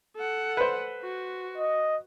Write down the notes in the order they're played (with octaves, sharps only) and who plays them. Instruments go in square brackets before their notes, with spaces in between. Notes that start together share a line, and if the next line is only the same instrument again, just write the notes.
[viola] A4 F#5
[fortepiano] B4 C5
[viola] F#4
[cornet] D#5